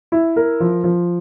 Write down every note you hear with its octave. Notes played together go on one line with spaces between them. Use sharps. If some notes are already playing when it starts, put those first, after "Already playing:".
E4
A#4
F3
F3